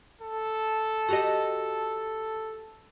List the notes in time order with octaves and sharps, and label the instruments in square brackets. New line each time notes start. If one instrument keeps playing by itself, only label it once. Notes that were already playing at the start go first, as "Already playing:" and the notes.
[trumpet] A4
[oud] F#4 G4 D#5